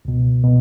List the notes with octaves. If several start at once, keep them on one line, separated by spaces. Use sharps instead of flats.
C#2 B2
B2